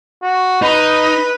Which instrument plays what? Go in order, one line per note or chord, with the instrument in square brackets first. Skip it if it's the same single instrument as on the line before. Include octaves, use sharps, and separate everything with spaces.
[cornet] F#4
[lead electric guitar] D#4 [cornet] B4